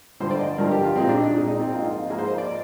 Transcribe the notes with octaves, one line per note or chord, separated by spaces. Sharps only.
G2 D3 F3 C5
D5
D#5
G2 D3 F3 A#4
G4
F4
A#2 G#3 C4
D4
D#4
A#2 G#3
D#4
C4
G#2 F3 A#3 D#4
F4
G#2 F3 A#3 G#4
C5
D#5
D5